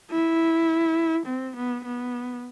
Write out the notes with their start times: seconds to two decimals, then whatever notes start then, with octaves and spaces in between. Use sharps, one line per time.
0.11 E4
1.26 C4
1.56 B3
1.85 B3